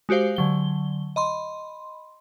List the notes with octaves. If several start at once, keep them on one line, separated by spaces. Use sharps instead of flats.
G#3 F#4 G4 C5 F5
D3 F#3 G7
D#5 B5 C6